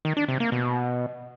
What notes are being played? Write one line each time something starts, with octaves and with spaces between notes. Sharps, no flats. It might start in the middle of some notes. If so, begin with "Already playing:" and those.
D#3
D4
C3
A#3
B2